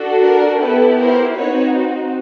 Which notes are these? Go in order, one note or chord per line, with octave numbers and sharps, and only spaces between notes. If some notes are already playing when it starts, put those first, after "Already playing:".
Already playing: D4 F#4 A4
A#4
B3 E4 G4 A4 B4
A#4 C5
C4 D#4 F#4 B4 C#5